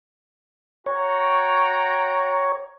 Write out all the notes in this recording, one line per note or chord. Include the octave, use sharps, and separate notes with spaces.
F#4 C#5 G5 A#5